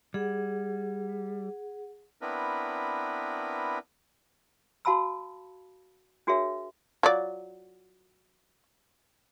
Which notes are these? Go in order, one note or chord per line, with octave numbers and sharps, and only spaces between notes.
G3 G#4 F#5
B3 C4 D4 E4 A#4 B4
F#4 F5 A5 B5 E6
D4 F#4 G#4 A#4 C#5 E5
F#3 F4 D5